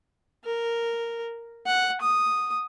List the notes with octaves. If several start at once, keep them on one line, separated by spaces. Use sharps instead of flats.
A#4
F#5
D#6